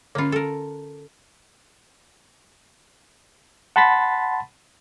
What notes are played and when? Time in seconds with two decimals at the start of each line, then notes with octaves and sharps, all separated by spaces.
0.15 D3 A#3 C#4 F4
0.32 A4 A#4
3.76 F#5 A5 B5 C6 A6 B6